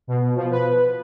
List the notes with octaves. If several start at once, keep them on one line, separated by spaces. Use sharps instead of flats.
B2
F3
B4